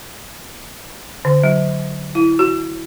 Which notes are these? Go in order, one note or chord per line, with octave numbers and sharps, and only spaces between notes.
D3
F#3
E4
F#4